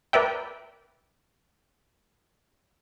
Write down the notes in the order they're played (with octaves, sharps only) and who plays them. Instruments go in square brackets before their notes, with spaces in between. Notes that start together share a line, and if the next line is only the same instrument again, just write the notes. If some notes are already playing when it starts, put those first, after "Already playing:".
[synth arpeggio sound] A#4 B4 D5 E5 G5